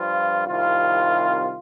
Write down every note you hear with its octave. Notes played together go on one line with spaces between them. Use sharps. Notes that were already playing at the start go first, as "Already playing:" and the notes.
Already playing: G2 F3 F4
C2 C3 D#3 F4